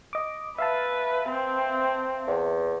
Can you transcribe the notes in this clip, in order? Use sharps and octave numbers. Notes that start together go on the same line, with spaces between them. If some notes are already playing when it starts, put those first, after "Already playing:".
D#5 D6
B4 E5 F5 A5
C4
E2